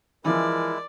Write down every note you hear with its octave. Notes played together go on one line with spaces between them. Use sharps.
E3 F3 G#3 E4 A#4 D5